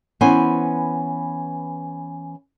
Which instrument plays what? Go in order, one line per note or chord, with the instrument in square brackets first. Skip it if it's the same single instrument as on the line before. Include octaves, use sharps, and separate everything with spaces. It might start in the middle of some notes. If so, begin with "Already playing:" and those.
[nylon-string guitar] E3 B3 C#4 C5 G#5